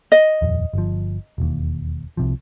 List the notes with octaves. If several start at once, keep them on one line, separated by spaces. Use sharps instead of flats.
D#5
D#1 F2
G1 F3
E1 D#2
C2 C3 F3